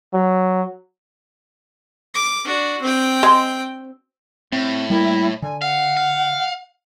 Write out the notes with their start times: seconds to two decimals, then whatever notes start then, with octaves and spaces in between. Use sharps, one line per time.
0.14 F#3
2.14 D6
2.44 D4 F#4
2.82 C4 G5
3.23 G#3
4.52 A2 C4
4.90 G3 A#3 E4
5.42 D3 G#5
5.62 F5 F#5
5.97 F5